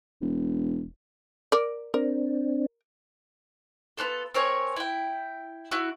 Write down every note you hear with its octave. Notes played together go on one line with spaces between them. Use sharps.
E1
A#4 D5
C4 D4 A#4
B3 D4 F4 A4
C4 A#4 C#5 G#5
E4 G5
E4 F#4